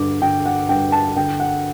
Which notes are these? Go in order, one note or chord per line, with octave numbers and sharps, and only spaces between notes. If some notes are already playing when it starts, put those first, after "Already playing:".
Already playing: G2 D3 D6
D3 G5
F#5
G2 G5
A5
D3 G5
F#5